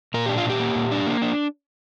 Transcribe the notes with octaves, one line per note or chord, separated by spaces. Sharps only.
A#2 A#4
D4 G4
F4
A#2 G4
A#3
A#2
D4
A#3
D4